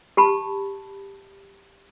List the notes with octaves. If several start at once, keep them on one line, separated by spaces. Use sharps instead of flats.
G4 A5 B5